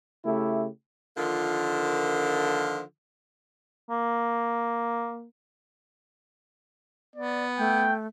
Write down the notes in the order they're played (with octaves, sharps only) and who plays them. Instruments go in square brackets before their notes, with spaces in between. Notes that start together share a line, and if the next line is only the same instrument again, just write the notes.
[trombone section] C#3 A3 E4 G4
[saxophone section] D3 D#3 F3 A#3 F4
[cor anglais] A#3
[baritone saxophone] B3 [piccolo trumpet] D5
[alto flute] A3 [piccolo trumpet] G5